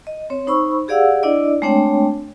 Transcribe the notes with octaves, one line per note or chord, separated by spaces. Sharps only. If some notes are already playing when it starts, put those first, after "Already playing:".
D#5
C4 C#5
D#4 C5 B5 C#6 E6
G4 G#4 D5 F5 F#5 E6
D4 E4 D5 D#5
G#3 A3 C4 D4 C#5 G5